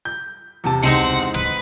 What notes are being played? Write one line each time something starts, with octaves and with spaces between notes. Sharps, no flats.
G6
E2 C3 A5
C#2 G#3 C4 D#4 F#5
D1 B4